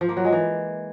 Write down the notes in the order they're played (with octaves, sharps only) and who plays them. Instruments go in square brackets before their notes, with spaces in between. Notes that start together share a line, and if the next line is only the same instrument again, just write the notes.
[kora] F3
A#3
F#3
G#3
E3